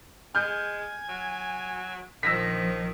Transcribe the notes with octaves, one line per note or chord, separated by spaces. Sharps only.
G#3 G#5 F6 G6
F#3
A#1 D#3 F3 E6 A#6 B6